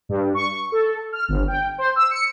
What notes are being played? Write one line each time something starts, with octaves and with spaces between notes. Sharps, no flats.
G2
C#6
A4
F6
G1
G5
C5
E6
C#7